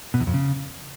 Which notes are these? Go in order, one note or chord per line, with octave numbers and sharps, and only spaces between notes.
B2
E2
F2
C#3